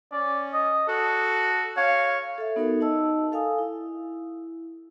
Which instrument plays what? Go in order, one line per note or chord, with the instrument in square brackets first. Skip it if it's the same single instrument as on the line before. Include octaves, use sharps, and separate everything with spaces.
[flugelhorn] C#4 [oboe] D5
[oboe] D#5
[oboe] F#4 [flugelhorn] A4
[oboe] C#5 [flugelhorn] F5
[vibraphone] A4 E5
B3 D#4 F#4 A4 A#4
D#4 D#5 A5 E6
A4 F5 G#5 D#6
E4